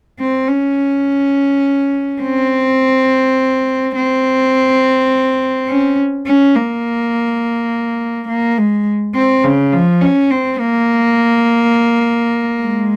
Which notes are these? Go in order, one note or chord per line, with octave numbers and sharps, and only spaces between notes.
C4
C#4
C4
C4
C#4
C#4
A#3
A#3
G#3
C4
C#3
F3
C#4
C4
A#3
G#3